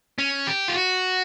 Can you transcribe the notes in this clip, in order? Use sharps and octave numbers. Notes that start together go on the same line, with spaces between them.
C#4
G4
F4
F#4